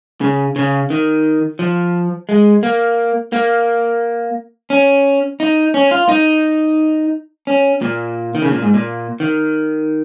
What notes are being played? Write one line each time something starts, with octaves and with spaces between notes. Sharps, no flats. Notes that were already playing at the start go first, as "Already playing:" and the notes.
C#3
C#3
D#3
F3
G#3
A#3
A#3
C#4
D#4
C#4
F4
D#4
C#4
A#2
D#3
C#3
A#2
G#2
A#2
D#3